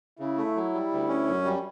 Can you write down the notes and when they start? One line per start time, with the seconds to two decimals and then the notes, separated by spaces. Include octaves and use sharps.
0.19 C#3 E4
0.37 A3
0.56 F#3
0.74 G3
0.92 D2
1.08 C#4
1.27 F#2
1.45 G3